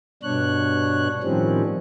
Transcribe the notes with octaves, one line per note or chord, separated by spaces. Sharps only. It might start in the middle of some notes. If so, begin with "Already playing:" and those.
G2 B2 D4 C#5 F#6
A2 D#3 F3 G3 C4 C#4